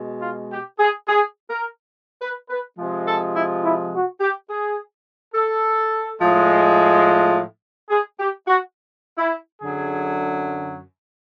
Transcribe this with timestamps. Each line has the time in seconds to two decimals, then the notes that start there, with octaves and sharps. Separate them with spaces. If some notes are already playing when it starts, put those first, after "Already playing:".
Already playing: B2 G#3
0.22 F4
0.51 G4
0.80 G#4
1.08 G#4
1.50 A#4
2.22 B4
2.50 B4
2.78 C3 F3 G#3
3.06 A4
3.35 E4
3.64 E4
3.92 F#4
4.21 G4
4.50 G#4
5.35 A4
6.20 A2 F3 G#3
7.90 G#4
8.19 G4
8.47 F#4
9.18 E4
9.61 F#2 D3 F#3 G#4